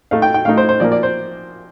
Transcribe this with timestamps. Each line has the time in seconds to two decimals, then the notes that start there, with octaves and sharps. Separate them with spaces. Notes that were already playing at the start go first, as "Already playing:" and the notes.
0.11 A2 A3 D#4 F5
0.22 G5
0.34 G5
0.45 A2 A3 D#4 F5
0.57 C5
0.69 C5
0.80 A#2 F3 A#3 D5
0.92 D5
1.03 C5